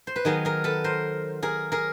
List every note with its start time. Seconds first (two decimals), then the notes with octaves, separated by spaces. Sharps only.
0.07 C5
0.16 B4
0.25 D#3 F#3 B3 G#4 A#4
0.45 G#4 A#4
0.64 A4 B4
0.84 A#4 C5
1.43 G#4 A#4
1.72 G#4 A#4